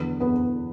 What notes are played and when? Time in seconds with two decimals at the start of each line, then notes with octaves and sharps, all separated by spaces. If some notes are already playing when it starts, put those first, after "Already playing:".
Already playing: E2 D3 F#3 B3
0.20 B3 B4